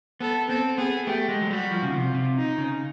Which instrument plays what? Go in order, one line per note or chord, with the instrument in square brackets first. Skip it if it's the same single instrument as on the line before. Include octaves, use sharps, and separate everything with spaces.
[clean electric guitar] B3 [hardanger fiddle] A4
[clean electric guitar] C4 [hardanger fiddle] A4
[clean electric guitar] B3 [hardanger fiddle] G#4
[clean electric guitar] A3 [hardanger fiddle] G4
[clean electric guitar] G#3
F#3
[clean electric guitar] G3 [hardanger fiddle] F#4
[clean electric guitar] F3
C#3
[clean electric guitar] C3 [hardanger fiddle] F4
[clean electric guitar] C3
[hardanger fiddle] D#4
[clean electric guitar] C#3